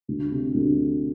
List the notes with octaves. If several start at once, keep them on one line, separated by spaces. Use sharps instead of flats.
D2
C3
D2